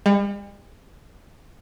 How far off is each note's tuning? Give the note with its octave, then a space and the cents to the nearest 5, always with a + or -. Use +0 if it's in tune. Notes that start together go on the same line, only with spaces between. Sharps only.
G3 +45